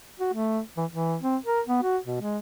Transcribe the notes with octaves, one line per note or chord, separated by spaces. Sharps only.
F#4
A3
E3
E3
C4
A#4
B3
F#4
B2
G#3